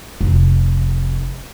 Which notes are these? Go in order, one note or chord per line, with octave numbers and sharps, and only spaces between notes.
F1